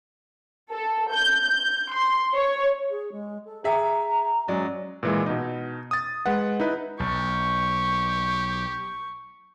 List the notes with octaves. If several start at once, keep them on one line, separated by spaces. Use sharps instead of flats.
A4
G6
G6
C6
C#5
G#4
G#3
A4
G#4 E5 G5 A#5
F#3 G#3 C#4 D5
A#2 E3 G#3
B2 D#4
D#6 A6
G#3 B4 F#5
D#4 E4 B4
B1 G4 C#6